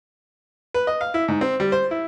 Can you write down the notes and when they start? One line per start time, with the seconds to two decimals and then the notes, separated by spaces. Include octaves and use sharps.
0.74 B4
0.87 D#5
1.01 F5
1.14 E4
1.28 G#2
1.41 C4
1.60 G3
1.72 C5
1.91 E4